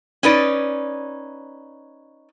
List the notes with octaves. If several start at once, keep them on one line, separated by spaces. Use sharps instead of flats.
C#4 D#4 B4 D5